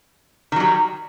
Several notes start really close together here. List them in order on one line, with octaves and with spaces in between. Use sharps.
D#3 F#3 G3